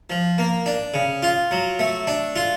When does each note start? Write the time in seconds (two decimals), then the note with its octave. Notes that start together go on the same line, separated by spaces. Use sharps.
0.10 F3
0.38 A#3
0.66 D4
0.94 C#3
1.23 F4
1.51 F#3
1.79 A3
2.07 D4
2.36 F4